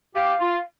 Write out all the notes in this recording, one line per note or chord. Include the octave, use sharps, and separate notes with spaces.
G4 F5
F4